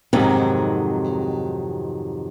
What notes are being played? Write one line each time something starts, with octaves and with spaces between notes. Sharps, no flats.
F2 G#2 C3 D#3 F#3